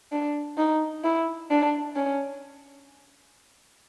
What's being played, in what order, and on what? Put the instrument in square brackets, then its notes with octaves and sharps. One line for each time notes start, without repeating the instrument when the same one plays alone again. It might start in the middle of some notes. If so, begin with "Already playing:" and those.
[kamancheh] D4
D#4
E4
D4
C#4